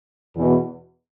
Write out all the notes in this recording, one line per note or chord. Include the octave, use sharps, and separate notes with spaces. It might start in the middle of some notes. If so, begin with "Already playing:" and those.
E2 B2